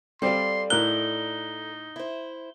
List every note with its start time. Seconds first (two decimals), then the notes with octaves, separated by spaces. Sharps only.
0.22 G3 C4 A4 D5 F5 C6
0.70 A2 D#4 A#4 F#6 G7
1.96 E4 C5